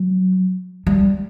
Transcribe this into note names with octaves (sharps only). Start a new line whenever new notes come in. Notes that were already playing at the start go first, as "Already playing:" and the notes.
Already playing: F#3
G3